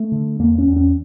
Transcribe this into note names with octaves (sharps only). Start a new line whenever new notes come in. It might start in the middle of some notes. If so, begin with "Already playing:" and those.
Already playing: A3
D3
E2 A#3
C#4
E2
C#4